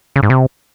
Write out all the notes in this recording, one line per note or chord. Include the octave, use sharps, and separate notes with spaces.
C#3
G#2
C3